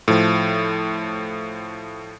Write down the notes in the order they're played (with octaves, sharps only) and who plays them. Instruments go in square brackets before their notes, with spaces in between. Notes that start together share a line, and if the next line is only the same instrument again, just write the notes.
[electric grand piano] A2 F3